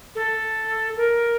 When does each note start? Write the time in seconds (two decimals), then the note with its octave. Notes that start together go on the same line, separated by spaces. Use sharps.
0.15 A4
0.96 A#4